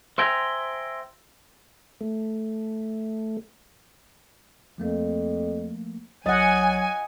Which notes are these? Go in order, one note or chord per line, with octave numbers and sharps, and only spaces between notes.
C5 E5 G5 G#5 A#5
A3
F2 F3 A3 A#3
B1 F#3 D#5 F#5 G#5 D#6 A6